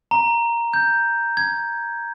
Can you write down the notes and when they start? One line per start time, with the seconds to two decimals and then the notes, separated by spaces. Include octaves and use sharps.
0.11 A#5
0.74 G6
1.37 G#6